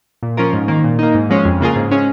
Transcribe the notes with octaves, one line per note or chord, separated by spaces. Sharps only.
A#2
F3 C#4 F4 A#4
G#2
D#3 A#3
A#2
A#3 D#4
G#2
F3 G#3 C#4
F2
C#3 A#3 F4 G#4
G#2
G#3 C#4 G#4